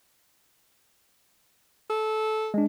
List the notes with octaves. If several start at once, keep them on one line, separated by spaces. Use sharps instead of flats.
A4
G#3 D4